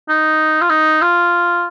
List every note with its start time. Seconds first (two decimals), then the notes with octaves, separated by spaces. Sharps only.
0.09 D#4
0.61 F4
0.70 D#4
1.01 F4